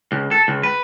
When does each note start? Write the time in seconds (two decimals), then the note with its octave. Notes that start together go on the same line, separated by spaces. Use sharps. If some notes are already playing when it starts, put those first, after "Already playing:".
0.12 C#2
0.31 A4
0.48 C#2
0.63 B4